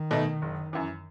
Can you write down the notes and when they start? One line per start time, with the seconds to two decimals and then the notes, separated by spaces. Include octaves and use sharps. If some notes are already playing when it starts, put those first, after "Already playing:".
Already playing: D#3
0.11 B2 A3 D#4
0.42 F#1
0.73 F#2 E3